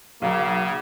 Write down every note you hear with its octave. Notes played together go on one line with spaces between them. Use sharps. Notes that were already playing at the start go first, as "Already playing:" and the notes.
B1 C#3 A#3